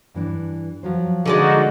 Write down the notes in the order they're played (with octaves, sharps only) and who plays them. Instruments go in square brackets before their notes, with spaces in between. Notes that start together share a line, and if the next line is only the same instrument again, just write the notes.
[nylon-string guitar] G2 E3 D4
F3 F#3 C5
[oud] D3 G#3 D5 [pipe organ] D#4 F#4